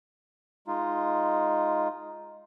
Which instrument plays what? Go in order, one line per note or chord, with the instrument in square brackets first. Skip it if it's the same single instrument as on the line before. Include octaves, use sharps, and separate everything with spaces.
[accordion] G#3 D#4 F4